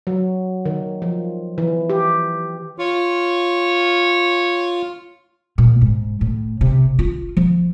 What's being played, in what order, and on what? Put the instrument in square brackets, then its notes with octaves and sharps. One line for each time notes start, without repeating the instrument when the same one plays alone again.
[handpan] F#3
D#3
F3
E3
G4
[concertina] F4 [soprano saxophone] C#5
[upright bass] A#2
G#2
A2
C3
F4
F3